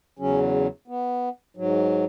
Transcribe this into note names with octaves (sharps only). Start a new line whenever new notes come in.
E2 C#3 F#3 C#4
B3
G#2 F#3